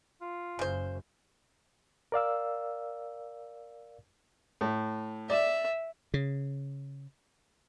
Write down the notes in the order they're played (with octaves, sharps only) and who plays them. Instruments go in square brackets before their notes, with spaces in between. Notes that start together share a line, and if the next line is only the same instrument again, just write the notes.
[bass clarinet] F4
[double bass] F#1 F#2 [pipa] C#3 C5
[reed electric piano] A#4 D5 F5 E6
[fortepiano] A2
[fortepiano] D5 [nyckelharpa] E5
[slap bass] C#3